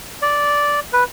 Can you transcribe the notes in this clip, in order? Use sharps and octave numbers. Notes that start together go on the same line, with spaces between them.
D5
B4